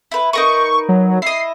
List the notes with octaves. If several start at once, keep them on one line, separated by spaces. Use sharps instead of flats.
E4 B4
D#4 A#4 B4 C#6
F#3
E4 D#5 C7